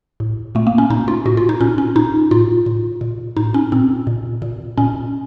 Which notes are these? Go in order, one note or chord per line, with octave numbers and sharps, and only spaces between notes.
A2
A#2 A3
A#3
C#4
A#2 D#4
F4
A2 F#4
F4
D#4
A#2 C#4
C#4
A#2 D#4
A2 F4
A2
A#2
A2 D#4
C#4
A#2 C4
A#2
A#2
A#2 C#4